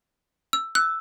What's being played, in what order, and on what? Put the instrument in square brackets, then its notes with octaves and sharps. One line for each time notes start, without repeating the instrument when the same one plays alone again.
[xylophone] E6
[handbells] E6 [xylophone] F#6